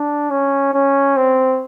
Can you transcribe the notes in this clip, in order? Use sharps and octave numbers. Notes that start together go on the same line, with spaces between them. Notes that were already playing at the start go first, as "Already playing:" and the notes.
Already playing: D4
C#4
C#4
C4